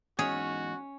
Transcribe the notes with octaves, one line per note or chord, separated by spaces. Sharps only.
E2 G#2 C#4 D#4 F#4 G#4